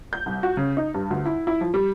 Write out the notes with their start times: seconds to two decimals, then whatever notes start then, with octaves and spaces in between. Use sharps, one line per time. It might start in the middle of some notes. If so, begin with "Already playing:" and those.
0.13 G6
0.26 C2
0.43 F#4
0.57 C#3
0.77 D#4
0.94 G2
1.11 D2
1.26 E4
1.47 E4
1.61 F3
1.74 G3